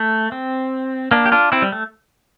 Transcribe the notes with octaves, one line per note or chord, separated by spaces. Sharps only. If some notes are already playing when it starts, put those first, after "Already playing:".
Already playing: A3
C4
A#3 D4
G4
D4 F4
C4 E4
G3
A3